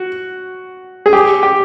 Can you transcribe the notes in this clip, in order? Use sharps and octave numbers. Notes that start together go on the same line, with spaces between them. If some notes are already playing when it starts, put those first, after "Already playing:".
Already playing: F#4
G#4
G4
G4